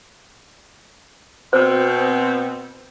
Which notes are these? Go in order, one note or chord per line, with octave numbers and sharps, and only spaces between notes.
B2 C4 C5